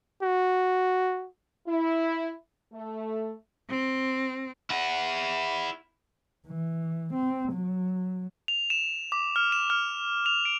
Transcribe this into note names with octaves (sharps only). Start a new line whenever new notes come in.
F#4
E4
A3
C4
E4 F#5
E3
C4
F#3
F7
E7
D6
F6
E7
F6
F7
D7